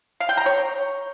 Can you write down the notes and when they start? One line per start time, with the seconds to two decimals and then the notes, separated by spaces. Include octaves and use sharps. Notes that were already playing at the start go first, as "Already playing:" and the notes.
0.20 F5
0.29 G5
0.37 A#5
0.46 C#5